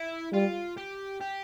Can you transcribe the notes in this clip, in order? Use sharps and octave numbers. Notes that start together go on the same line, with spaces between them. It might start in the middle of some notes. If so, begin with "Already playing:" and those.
Already playing: E4
G3 F4
G4
G4